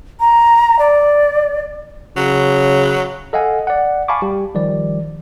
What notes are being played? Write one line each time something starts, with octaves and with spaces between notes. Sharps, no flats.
A#5
D5
C#3 F#3
A4 D#5 F5 F#5 G#5
D5 F#5
F5 G#5 A5 B5 C#6 D6
G3 G4
D#3 F3 G3 D5